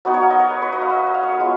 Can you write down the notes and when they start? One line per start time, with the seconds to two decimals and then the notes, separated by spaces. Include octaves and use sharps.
0.05 F#3 B3 D#4
0.14 C#5
0.23 F5
0.30 D#5
0.39 C#5
0.50 B4
0.62 B4
0.72 D#5
0.81 F5
0.90 D#5
0.98 F5
1.07 D#5
1.14 F5
1.23 C#5
1.32 B4
1.40 G#3 B3 F4